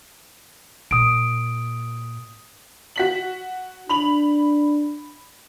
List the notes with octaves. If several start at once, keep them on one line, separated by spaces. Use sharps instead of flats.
A#2 D#6 D7
F#4 B6 F#7
D4 B5 F7 F#7